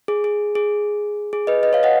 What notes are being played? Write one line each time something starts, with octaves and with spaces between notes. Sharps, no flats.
G#4
G#4
G#4
G#4
B4 D#5
B4 D#5
C#5 F5
D#5 F#5